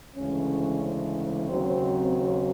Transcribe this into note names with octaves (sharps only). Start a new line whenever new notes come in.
D2 C#3 E3 G#3 C#4
C4
D#2 C#3 F#3 C4
C4